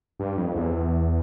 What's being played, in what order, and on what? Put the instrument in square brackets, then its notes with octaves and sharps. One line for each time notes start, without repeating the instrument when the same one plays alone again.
[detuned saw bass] G2
F2
E2